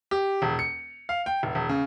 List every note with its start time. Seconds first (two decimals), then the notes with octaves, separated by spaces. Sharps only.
0.11 G4
0.42 E1
0.59 C#7
1.09 F5
1.26 G5
1.43 F1
1.55 E1
1.69 C#3